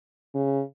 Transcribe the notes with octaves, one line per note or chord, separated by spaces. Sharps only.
C#3